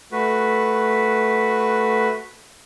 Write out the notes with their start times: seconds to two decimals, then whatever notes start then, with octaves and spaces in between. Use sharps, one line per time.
0.12 A3 F#4 B4